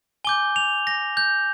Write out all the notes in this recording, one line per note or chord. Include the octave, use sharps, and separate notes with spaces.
G#5 D6 G6 G7
F7
A#6
G6